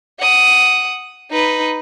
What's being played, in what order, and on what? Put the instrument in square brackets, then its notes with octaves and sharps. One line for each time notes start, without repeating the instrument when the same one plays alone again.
[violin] F#5 D#6
D#4 B4